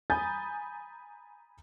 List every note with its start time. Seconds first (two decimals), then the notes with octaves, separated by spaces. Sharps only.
0.10 G#5 A#5 B5 D#6 G6 A6